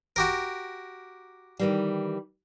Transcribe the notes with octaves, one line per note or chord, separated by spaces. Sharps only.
F#4 G4 A#4
D#3 E3 G3